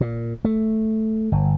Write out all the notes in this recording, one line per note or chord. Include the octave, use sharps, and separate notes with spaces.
A#2
A3
G1